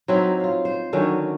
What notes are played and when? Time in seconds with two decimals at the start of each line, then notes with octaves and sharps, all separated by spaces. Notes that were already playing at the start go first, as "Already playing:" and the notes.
0.08 F#3 C4 D#4 E4
0.40 F4 F5
0.65 C5
0.93 D3 D#3 F#3 C#4